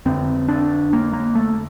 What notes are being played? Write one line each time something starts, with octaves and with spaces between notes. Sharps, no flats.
F2 D3 C4
D4
A#3
A#3
A3